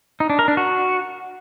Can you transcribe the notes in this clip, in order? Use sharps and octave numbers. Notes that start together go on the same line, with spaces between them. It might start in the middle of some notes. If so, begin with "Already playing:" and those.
D#4
D4
A#4
D4
F#4